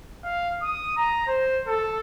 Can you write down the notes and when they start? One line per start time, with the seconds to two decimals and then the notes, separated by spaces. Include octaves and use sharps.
0.24 F5
0.62 D#6
0.97 A#5
1.27 C5
1.67 A4